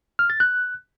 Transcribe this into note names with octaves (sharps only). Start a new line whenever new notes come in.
F6
A6
F#6